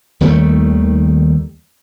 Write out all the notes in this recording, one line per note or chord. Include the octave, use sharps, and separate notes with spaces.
D#2 D#3 G3 A3